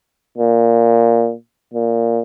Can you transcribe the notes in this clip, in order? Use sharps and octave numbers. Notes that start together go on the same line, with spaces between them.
A#2
A#2